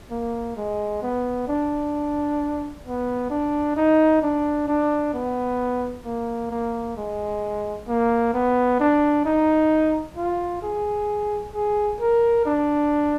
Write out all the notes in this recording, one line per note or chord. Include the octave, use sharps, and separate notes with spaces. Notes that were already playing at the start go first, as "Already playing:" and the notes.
A#3
G#3
B3
D4
B3
D4
D#4
D4
D4
B3
A#3
A#3
G#3
A#3
B3
D4
D#4
F4
G#4
G#4
A#4
D4